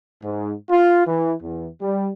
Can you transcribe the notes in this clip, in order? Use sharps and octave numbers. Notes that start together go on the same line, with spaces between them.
G#2
F4
E3
E2
G3